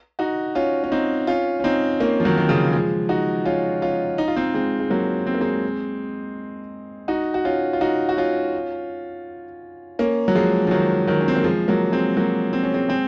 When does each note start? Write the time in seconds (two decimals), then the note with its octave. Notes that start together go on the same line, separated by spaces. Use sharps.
0.19 D#4 F#4
0.55 C#4 F4
0.84 C#4
0.92 C4 D#4
1.27 C#4 F4
1.60 C#4
1.64 C4 D#4
2.00 A#3 C#4
2.20 F3
2.25 D#3 F#3
2.38 D#3
2.49 C#3 F3
2.73 F3 G#3
3.09 D#4 F#4
3.45 C#4 F4
3.82 C#4 F4
4.18 D#4
4.28 F4
4.36 C4 D#4
4.54 G#3 C4
4.80 G#3
4.90 F#3 A#3
5.27 C4
5.34 A#3
5.41 G#3 C4
7.08 D#4 F#4
7.34 F#4
7.45 C#4 F4
7.73 F4
7.81 D#4 F#4
8.09 F#4
8.17 C#4 F4
9.99 A#3 C#4
10.28 F#3
10.35 F3 G#3
10.67 F3
10.71 D#3 F#3
11.07 D#3 F#3
11.21 C#4
11.28 C4
11.36 A#3
11.44 F3 G#3
11.68 F#3 A#3
11.92 G#3 C4
12.17 F#3 A#3
12.53 C4
12.63 C#4
12.74 G#3 C4
12.89 G#3 C4